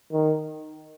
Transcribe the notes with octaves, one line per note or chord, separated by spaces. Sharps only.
D#3